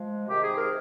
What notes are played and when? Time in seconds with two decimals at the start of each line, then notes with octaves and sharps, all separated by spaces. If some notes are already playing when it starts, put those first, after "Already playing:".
Already playing: F3 G#3
0.28 C3 D#3 G#3 G4
0.42 G#4
0.57 A#4